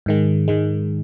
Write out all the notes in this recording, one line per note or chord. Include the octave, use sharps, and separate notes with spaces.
G#2 D#3 G#3
G#2 D#3 G#3